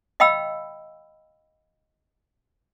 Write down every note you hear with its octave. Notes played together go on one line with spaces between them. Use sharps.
D#5 F5 G5 B5 E6